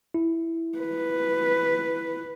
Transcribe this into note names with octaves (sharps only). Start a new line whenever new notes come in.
E4
B4